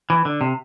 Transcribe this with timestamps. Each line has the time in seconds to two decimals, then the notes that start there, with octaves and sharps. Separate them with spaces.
0.10 E3
0.25 D3
0.41 C3